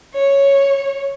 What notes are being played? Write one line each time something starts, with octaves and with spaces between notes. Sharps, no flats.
C#5